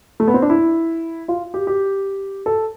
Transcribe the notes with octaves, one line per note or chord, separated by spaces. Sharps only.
A3
B3
C4
D4
E4
F4
G4
G4
A4